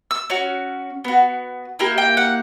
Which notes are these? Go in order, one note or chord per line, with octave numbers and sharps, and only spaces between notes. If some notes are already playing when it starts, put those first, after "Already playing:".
E6
C#4 F#4
B3 F#4
A#3 E4 G4
G5
F#5